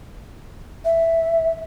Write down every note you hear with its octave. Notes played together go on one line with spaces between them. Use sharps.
E5